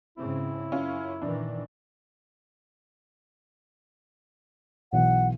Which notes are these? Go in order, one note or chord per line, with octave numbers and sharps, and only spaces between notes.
G#2 C#3 C4 E4
F#2 C#4 F4
A#2 D#3 E3 D4
B1 E3 F#5